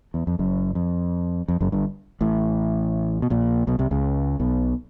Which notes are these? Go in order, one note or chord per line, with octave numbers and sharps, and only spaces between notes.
E2
F2
F#1 F#2
F2
F2
F#1 F#2
G1 G2
A1 A2
B2
A#1 A#2
B1 B2
C2 C3
C#2 C#3
B1 B2